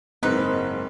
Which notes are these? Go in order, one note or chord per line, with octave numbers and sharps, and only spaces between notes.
F#1 G#2 C4 D#4 A#4 B4